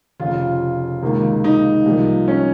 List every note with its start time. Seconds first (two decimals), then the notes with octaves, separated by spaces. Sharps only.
0.20 F1 F2 C#3 F4
1.02 C#2 C3 D#3 A#3
1.44 D#4
1.86 C2 C3 F3 A#3
2.28 C#4